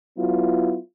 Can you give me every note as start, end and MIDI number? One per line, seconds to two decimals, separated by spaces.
0.17 0.77 54
0.17 0.77 59
0.17 0.77 64
0.17 0.77 65